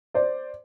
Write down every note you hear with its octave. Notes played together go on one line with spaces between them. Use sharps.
C5 D5